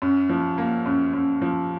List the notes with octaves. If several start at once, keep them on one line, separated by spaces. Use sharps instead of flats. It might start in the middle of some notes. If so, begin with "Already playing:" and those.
F#2
F3
A#3
F#2
F#2
F3